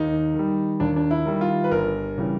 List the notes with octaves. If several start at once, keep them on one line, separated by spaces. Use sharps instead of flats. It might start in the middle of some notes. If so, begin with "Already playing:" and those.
Already playing: D#2 D#4
D#3 G3
D#2 D4
D4
E4
D#3 G3
F4
B4
G1 A#4
C#3 E3 G3